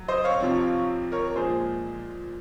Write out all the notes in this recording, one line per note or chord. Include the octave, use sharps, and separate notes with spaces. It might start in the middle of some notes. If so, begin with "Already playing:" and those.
Already playing: F#3
C5 D#5
C#5 F5
F2 C3 F3 C4
A#4 C#5
A#2 F3 G#3 G#4 C5